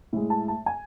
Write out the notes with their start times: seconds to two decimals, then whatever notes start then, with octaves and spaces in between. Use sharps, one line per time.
0.13 A2 G#3
0.30 A5
0.48 A5
0.66 G#5